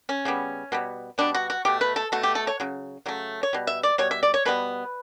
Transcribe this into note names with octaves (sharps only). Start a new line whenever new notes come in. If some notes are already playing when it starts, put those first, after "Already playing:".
C#4
C#3 E3 G3 B3
B2 G3 B3
B2 G3 B3 D4
F#4
F#4
B2 A3 G4
B4
A4
B2 A3 F#4
G4
A4
C#5
C#3 F#3
C#3 F#3 A3
C#5
B2 G3
E5
D5
B2 G3 C#5
E5
D5
C#5
B2 G3 B3 B4